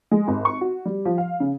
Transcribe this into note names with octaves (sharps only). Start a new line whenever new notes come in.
G#3
G#1
C#6
F#4
G3
F3
F5
C#3